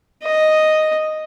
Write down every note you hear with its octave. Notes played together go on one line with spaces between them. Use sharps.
D#5